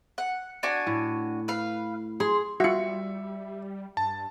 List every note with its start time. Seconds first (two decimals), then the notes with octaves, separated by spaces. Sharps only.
0.18 F#5
0.63 D4 F#4 G#5
0.87 A2
1.48 B4 F5
2.20 G#4 C6
2.60 G3 F4 F#4 E5 C#7
3.97 G2 A5